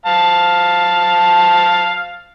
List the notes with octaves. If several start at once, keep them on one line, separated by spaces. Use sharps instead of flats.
F5 A5